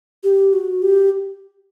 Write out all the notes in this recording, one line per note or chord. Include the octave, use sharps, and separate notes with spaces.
G4
F#4
G4